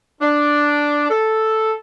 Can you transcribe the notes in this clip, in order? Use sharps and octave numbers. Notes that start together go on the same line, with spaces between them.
D4
A4